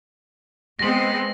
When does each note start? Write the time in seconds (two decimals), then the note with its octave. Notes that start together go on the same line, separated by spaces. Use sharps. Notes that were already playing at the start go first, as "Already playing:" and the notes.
0.79 G#3 B3 C4 A#6 F#7